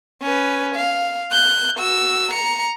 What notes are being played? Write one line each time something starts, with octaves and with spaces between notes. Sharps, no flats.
C#4 B4
F5
F#6 G6
F#4 E6
A#5 C#7